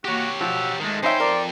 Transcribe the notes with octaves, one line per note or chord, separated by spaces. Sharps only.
A#3 F#4 G4 C#5
B2 F3 F#5 E6
D#3 G#3 A3
F2 D#4 C5 C#5 E5 G5 G#5 B5
A#4 D5